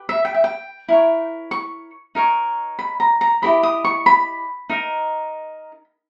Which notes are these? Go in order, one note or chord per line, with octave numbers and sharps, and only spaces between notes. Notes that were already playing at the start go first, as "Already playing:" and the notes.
Already playing: G4 B4
E5
G5
E5
G5
E4 A#4 C#5
C#6
D#4 A#4 C#5
B5
A#5
A#5
E4 G4 A#4 D#5 B5
D#6
C#6
B5
D#4 A#4 D#5